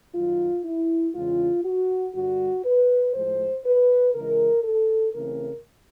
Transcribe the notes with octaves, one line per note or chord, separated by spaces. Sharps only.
F#2 D#3 F#3 F4
E4
E2 C#3 E3 G#3 F4
F#4
G2 D3 G3 F#4
B4
A2 F3 G#3 C5
B4
C#3 E3 G#3 A#4
A4
C#3 E3 A3 C4 A#4